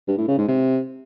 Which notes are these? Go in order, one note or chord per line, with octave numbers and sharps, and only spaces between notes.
G2
A2
C#3
G#2
C3